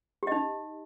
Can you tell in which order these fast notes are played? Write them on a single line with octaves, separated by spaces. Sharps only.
G4 D#5 D#4